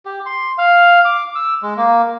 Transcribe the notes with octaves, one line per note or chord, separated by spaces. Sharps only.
G4
C6
F5
D6
E6
G#3
A#3